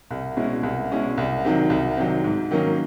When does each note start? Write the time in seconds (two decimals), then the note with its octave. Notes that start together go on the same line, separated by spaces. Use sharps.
0.11 C2
0.37 B2 G#3 C#4 E4
0.63 C2
0.91 B2 G#3 C#4 E4
1.18 C2
1.44 C3 D#3 F#3
1.70 C2
1.97 C3 D#3 F#3
2.24 G#2
2.51 D#3 F#3 A#3 C#4